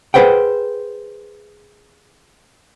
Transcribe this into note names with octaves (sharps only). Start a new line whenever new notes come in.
G#4 A4 B4 C5 F#5 G5